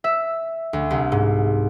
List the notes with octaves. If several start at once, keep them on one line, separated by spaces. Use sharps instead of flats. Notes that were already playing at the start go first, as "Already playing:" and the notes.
E5
D2
C2
G#2